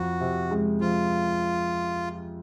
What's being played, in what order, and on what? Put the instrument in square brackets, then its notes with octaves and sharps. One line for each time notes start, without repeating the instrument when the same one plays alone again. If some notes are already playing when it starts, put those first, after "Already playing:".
Already playing: [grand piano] F2 [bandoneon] F#4
[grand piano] C3
G#3
[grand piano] F3 [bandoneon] F4